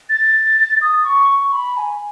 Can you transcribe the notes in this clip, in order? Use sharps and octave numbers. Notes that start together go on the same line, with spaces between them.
A6
D#6
C#6
C#6
B5
G#5